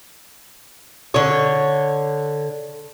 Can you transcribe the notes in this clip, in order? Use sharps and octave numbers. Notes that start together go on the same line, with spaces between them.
D3 C#5